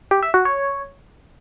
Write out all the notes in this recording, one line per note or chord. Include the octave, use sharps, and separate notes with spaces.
G4
E5
F#4
C#5